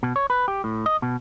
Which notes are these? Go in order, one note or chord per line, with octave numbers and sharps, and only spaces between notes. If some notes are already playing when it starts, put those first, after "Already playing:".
B2
C#5
B4
G4
A2
D#5
B2